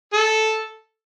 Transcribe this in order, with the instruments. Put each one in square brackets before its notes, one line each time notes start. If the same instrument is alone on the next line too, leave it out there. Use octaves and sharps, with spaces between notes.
[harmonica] A4